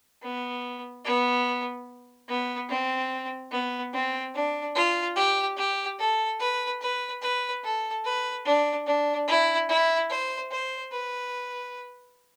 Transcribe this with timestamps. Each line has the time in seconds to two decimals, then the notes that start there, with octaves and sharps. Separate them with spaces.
0.22 B3
1.05 B3
2.28 B3
2.69 C4
3.51 B3
3.93 C4
4.34 D4
4.75 F4
5.16 G4
5.57 G4
5.99 A4
6.40 B4
6.81 B4
7.22 B4
7.64 A4
8.05 B4
8.45 D4
8.86 D4
9.28 E4
9.69 E4
10.10 C5
10.51 C5
10.92 B4